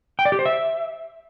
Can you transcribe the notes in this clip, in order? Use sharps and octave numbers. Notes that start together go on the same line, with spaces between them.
G5
D5
G4
C5
E5